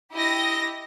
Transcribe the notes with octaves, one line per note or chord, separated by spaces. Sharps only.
E4 G4 D#5 A#6